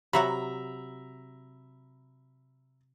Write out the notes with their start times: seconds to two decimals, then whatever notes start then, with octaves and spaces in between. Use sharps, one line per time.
0.13 C3 F#3 E5 F#5 A#5 B5